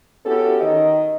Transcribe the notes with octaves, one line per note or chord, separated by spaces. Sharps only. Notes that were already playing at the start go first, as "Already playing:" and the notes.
B3 C#4 E4 F#4 G4 A4
D#3 D#5